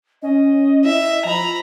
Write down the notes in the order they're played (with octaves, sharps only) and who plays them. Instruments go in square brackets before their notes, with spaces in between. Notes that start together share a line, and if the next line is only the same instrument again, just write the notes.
[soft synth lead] C#4 [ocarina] D#5
[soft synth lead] E4 [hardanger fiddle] E5
[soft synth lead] F3 [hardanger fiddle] A#5 B5